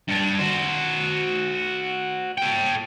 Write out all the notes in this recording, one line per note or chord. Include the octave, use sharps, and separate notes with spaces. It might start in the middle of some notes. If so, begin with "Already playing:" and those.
G2 D4
F#4 C5
A4 G5